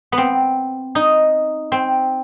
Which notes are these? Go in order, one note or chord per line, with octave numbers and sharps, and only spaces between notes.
B3
C4
D#4
C4